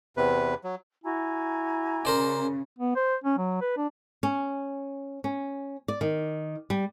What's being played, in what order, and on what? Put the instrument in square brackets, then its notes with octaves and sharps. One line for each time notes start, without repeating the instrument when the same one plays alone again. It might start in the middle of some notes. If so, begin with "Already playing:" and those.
[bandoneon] E2 C3 B4
F#3
[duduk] E4 [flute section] F#4 G#5 A#5
[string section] C#3 [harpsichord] A#4 C5 D5
[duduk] B3
C5
C#4
F#3
B4
D4
[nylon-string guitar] C#4
C#4
D5
D#3
G3